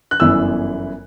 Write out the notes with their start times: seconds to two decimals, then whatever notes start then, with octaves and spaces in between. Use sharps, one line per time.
0.11 F#6
0.20 G1 F#2 E3 B3 E4 E6